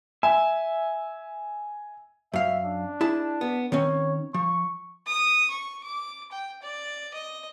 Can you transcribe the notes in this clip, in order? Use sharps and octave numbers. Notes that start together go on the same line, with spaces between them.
E5 G#5
F#2 E5 F5
D4
E4 G#4 A5
B3
D#3 C4 C#4 C#5
F3 C#6
D#6
C#6
D6
G5
D5
D#5